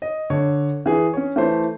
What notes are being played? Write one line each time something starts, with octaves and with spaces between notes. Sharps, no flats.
D#5
D3 C#5
E3 G#4
C#4 C#5
E3 A3 C5